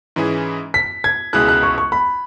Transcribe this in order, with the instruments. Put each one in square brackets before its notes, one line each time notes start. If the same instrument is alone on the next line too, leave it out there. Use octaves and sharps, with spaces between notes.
[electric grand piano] G#2 E3 C#4 E4 G#4
[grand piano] B6
G#6
[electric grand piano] C#2 B2 G#3 E4 G#4 [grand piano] F#6
[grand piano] F#6
C#6
C#6
B5